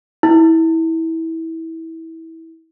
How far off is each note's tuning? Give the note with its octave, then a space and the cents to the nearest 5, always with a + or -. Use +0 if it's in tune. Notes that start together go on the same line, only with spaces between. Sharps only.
E4 -20